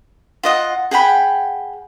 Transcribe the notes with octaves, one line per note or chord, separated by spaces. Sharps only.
F4 D#5 F#5
G#4 F#5 G5 B5